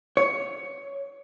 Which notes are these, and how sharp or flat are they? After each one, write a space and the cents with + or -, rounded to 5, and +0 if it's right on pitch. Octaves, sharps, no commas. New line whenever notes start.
C#5 +10